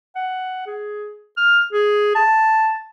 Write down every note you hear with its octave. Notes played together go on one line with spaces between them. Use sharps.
F#5
G#4
F6
G#4
A5